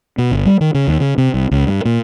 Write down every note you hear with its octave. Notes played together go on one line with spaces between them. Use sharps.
B2
G1
G3
D#3
C#3
D#2
C#3
C3
C2
C#2
G2
A#2